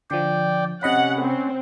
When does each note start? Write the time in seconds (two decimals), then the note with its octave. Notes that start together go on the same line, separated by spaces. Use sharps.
0.11 D3 F3 D5 G5
0.83 C3 C#4 D#5 F#5 B5
1.22 C4